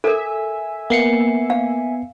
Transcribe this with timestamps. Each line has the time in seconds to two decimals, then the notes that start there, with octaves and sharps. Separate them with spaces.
0.04 A4 A#4 E5 G#5
0.90 A#3 B3 C7 C#7
1.50 F5